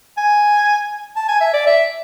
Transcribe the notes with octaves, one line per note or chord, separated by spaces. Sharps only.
G#5
A5
G#5
E5
D5
E5